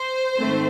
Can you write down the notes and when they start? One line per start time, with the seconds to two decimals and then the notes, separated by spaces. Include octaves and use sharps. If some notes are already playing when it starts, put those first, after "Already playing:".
Already playing: C5
0.39 G#2 D#3 A3 C4